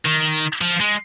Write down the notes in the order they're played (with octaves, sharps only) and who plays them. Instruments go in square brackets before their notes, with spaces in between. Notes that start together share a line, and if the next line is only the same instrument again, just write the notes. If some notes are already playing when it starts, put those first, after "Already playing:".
[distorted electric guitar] D#3
F3
G#3